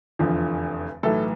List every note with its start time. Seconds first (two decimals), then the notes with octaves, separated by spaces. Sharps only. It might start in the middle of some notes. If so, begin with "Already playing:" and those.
0.19 F1 E2 D3 F3
1.03 B1 A2 E3 A4